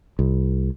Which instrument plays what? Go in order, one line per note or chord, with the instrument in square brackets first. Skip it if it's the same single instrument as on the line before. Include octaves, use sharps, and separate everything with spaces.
[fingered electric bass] C2